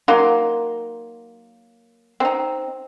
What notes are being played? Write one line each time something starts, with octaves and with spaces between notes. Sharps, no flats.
F#3 A#3 D#4 C6
C4 D#4